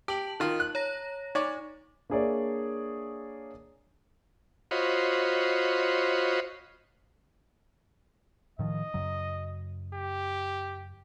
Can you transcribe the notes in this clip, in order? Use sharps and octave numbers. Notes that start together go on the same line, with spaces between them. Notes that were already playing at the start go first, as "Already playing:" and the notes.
G4 A5 F#7
D#3 F4
F#6
C#5 A#5 A#6
D#4 C#5 D5
A#3 D4 G#4 C#5 D5 E5
F4 F#4 C5 C#5 D#5 B5
A2 D#3 F3 D#5
F#2 C#3 F#3
G4